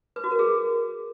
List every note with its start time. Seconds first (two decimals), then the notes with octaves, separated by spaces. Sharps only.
0.16 B4
0.24 F#4
0.31 A#4
0.39 G#4